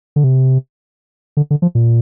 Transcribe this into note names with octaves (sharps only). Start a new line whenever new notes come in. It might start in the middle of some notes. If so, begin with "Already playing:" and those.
D3
C3
D3
D3
F3
A#2